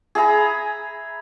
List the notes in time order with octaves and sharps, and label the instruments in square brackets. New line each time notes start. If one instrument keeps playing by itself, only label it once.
[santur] G#4 E5 A#5 B5